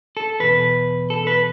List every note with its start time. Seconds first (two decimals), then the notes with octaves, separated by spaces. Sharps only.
0.17 A4
0.40 E2 B2 B4
1.10 A4
1.27 B4